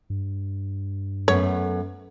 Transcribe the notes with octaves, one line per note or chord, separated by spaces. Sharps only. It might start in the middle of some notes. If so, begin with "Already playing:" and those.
G2
F#2 A3 B3 C#5